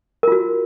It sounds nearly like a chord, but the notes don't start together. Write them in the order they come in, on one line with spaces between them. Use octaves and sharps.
A#4 F4 F#4